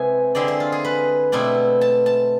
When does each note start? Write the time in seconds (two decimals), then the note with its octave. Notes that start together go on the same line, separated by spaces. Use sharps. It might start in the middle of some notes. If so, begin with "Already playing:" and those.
Already playing: C3 G#3 B3 E4 B4 E5 G#5
0.35 D3 G#3 C4 E4 D5
0.48 C5
0.60 F4
0.72 G#4
0.84 B4
1.32 B2 A3 C4 E4 D5
1.81 A5
2.06 A5